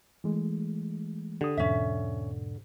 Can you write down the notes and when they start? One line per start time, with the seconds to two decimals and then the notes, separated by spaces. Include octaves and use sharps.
0.24 E3 G#3 A3
1.41 D3 G4 D#6
1.57 E2 G#2 B2 C#4 E5